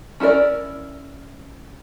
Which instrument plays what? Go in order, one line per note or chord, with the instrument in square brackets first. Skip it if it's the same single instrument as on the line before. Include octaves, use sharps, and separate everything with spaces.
[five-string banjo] C#4 E4 F#4 A#4 D5